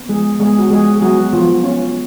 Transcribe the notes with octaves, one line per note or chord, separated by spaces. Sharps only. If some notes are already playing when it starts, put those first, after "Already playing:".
Already playing: B3
F3 G#3 G#4
G#3 B3 G#4
F#4
F3 G#3 G#4
G#4
F#3 B3 F#4
F3 B3 F4
B3 C#4